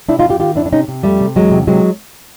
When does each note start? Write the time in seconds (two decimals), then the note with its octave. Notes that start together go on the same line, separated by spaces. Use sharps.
0.08 C3 D4 E4
0.19 D#4 F4
0.24 F2
0.29 F4 G4
0.40 D#3 F4 G4
0.56 F2 D4 E4
0.66 D4
0.72 C3 C#4 D#4
0.88 C3
1.03 F2 G3 A3
1.20 C3
1.36 E2 F#3 G#3
1.51 C3
1.67 C3 F#3 G#3